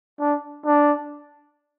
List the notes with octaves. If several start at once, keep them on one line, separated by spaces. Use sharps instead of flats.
D4
D4